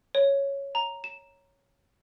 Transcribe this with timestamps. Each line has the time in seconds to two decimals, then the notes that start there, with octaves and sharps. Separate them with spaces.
0.15 C#5
0.75 A#5
1.04 E7